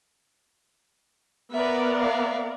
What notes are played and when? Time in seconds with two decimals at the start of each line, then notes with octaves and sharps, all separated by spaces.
1.51 B3 A#4 B4 D5 E5
1.99 E5 F5